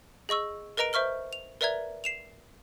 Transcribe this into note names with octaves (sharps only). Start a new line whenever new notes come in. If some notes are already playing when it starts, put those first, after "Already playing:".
G#4 D#5 C#6 E6
A#4 B4 D#5 A#5 D7
C5 E5 C#6 F6 G7
F7
A#4 B4 D5 E5 A#5 G#6
C7 E7 F7